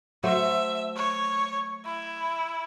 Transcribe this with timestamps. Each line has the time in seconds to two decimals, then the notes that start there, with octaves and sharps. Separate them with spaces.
0.24 F#3 A3 C5 E5
0.96 C#5
1.85 E4